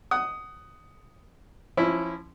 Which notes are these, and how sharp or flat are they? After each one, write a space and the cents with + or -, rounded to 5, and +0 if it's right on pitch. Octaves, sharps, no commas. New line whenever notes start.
F#5 +20 D#6 +0
F3 -20 C#4 -30 E4 +0